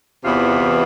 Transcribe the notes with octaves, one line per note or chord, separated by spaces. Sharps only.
E2 C3 E3 B3 F4